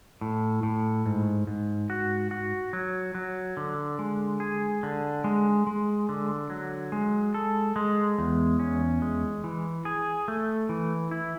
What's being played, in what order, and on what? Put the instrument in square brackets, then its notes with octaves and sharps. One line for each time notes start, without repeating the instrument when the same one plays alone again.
[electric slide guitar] A2
A2
G#2
G#2
F#4
F#4
F#3
F#3
D3
G#3
G#4
D3
G#3
G#3
D3
F#3
G#3
A4
G#3
E2
C#4
G#3
E3
G#4
A3
E3
E4